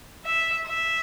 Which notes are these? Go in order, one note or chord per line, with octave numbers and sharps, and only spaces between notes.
E5
E5